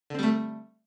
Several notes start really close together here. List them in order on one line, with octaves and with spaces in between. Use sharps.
D3 C4 G3 A3